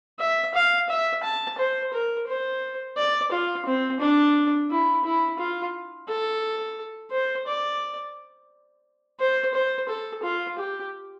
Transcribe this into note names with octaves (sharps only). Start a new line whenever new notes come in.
E5
F5
E5
A5
C5
A#4
C5
D5
F4
C4
D4
E4
E4
F4
A4
C5
D5
C5
C5
A4
F4
G4